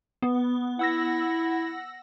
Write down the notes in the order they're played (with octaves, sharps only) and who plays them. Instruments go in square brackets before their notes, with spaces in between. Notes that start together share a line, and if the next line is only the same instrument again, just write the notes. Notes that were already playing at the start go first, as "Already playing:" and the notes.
[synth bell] B3
[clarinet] E4 [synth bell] F#5 E6 A#6